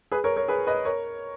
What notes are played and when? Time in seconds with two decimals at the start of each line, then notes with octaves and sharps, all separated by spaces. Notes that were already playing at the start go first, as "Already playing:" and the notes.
0.12 G#4 B4
0.24 A#4 C#5
0.36 A#4 C#5
0.48 G#4 B4
0.67 B4 D#5
0.85 A#4 C#5